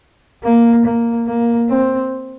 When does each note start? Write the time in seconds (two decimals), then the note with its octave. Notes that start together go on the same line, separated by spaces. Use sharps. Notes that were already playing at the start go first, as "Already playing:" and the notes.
0.44 A#3
0.85 A#3
1.27 A#3
1.68 C4